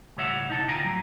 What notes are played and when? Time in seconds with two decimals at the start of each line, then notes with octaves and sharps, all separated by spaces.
0.17 C#2 A2 G3 C#5 E5 F#5
0.49 C3 D#4 E4 F#5 A5
0.68 D2 F4 G5 G#5 A#5
0.84 A2 F#3